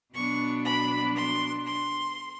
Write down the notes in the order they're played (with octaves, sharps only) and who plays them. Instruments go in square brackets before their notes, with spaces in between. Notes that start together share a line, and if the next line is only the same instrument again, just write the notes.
[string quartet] B2 F#3 B3 D4 C#6
B5
C6
C6